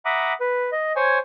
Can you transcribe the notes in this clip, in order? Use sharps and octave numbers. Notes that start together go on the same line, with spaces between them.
E5 F#5 A#5 B5 D6 D#6
B4
D#5
C5 C#5 G#5